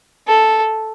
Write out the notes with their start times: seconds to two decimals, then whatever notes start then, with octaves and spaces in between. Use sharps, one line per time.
0.28 A4